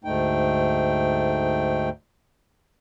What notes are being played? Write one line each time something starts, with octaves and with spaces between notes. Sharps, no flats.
D2 G#2 A3 D#4 G5